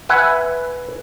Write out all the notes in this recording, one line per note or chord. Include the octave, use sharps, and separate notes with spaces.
B4 E5 F#5 G#5